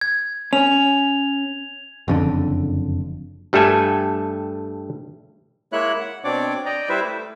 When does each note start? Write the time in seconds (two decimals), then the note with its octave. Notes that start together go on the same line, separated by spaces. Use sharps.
0.01 G#6
0.53 C#4 F7
2.08 F#1 F2 D3
3.53 G2 G3 A3 A4 G#5
5.72 G#3 A#3 E4 C#5 E5 F#6
6.00 F#5
6.24 B2 C4 D4 C#5 D5 D6
6.66 D5 D#5 G5 A#5
6.89 G3 E4 B4 C5 E5
7.04 A3